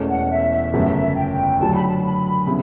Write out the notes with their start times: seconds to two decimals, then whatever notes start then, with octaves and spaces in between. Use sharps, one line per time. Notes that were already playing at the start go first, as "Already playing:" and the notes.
Already playing: E1 E2 B2 A3 C#4
0.08 F#5
0.31 E5
0.51 E5
0.73 G1 F#2 C#3 F#3 A3 E5
1.16 G5
1.60 D2 D3 F#3 A5
1.74 B5
1.87 A5
1.98 A5
2.04 B5
2.47 C#3 G3 B3 E4